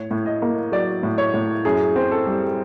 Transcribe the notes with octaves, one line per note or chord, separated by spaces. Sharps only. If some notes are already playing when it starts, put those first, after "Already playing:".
Already playing: A2 C#5
A2
D#5
A#3
F#3 D5
A2
C#5
A2
F#2 G#4
C4
A4
G3